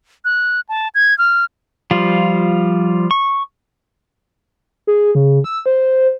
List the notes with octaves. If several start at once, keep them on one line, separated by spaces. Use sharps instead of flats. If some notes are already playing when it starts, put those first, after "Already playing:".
F#6
A5
G#6
F6
F3 G3 F4
C#6
G#4
C#3
E6
C5